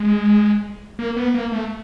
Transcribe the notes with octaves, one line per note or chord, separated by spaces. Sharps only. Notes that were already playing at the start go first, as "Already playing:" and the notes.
Already playing: G#3
A#3
B3
A#3
A3